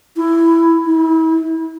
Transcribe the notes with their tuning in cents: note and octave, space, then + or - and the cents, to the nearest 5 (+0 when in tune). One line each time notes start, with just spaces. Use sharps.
E4 +10
E4 -35